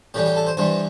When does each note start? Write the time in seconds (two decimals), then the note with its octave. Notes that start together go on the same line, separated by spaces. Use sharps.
0.14 A2 E3 G3 G4
0.26 G4
0.36 A4
0.47 C5
0.57 G2 E3 G3 C5